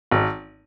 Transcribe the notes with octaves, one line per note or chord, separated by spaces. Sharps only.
G#1